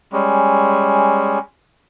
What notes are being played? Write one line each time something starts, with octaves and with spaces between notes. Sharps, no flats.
G3 G#3 C#4